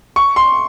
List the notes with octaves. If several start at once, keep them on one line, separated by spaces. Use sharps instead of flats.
C#6
C6